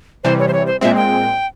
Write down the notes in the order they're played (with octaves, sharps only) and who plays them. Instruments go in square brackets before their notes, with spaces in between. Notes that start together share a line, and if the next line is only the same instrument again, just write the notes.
[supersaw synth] C3 E3 G3 [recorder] C5
[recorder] C#5
C5
C#5
C5
[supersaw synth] A#2 G#3 C4 [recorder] E5
[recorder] G5